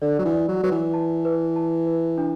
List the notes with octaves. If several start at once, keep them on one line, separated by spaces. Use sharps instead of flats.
D3 D5
F#3
E3
D5
F#3
F#3 B4
E3
A5
B4
A5
B4
D4